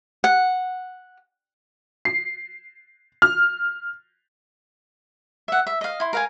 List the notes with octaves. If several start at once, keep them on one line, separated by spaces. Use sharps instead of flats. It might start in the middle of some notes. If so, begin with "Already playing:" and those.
F#5
C7
F6
E5 F#5
E5
D#5 F5
E4 C6
A#4 F5 G#5